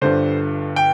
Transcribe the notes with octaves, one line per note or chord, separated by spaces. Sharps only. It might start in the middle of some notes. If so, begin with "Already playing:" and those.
G1 G2 D3 C5
G5